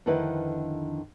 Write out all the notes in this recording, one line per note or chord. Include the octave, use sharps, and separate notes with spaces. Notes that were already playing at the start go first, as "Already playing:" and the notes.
F2 D3 D#3 E4 B4 D#5